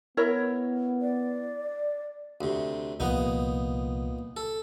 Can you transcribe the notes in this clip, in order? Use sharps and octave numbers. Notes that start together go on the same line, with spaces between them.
B3 E4 A#4 C#5
D5
D2 C3
C2 A#2 F3 B3 D#4
A4